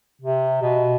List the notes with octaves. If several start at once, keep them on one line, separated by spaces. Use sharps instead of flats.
C3
B2